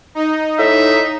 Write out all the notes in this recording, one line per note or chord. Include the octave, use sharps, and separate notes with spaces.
D#4
A2 E5